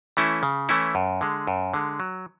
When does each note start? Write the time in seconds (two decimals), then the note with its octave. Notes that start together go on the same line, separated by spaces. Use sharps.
0.17 E3 A3 C#4 E4
0.43 C#3
0.69 E3 A3 C#4 E4
0.95 F#2
1.21 D3 G#3
1.47 F#2
1.74 D3 G#3
2.00 F#3